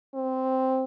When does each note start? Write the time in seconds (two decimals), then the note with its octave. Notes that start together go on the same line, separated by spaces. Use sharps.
0.14 C4